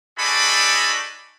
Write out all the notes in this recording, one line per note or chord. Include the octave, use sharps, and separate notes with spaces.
D#4 F#4 G#4 A4 D5 B5